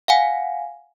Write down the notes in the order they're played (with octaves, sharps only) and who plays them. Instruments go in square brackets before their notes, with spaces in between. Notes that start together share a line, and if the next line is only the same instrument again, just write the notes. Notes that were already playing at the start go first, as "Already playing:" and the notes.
[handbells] F5 F#5 G#5